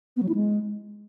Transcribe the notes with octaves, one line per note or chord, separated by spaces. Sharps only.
B3
F#3
E4
G#3